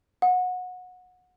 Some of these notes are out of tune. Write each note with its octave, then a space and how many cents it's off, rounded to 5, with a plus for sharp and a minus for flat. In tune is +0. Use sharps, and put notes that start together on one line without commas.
F#5 -25